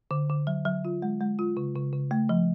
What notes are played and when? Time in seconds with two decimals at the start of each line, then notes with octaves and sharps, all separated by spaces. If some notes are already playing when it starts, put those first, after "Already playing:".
0.11 D3
0.30 D3
0.47 F#3
0.66 F#3
0.85 F4
1.02 G#3
1.21 G#3
1.39 F4
1.57 C#3
1.76 C#3
1.93 C#3
2.11 A3
2.29 F3